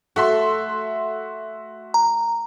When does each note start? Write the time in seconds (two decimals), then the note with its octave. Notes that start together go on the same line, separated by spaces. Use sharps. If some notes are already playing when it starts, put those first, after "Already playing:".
0.16 A3 F#4 E5 C6
1.94 A#5